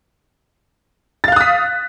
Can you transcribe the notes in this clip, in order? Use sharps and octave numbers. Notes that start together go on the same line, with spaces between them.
F5 D#6 F#6 A6 B6